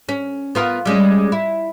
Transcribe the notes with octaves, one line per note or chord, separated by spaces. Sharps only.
C#4
B3 F4 A#4
G3 G#3 C#4
E4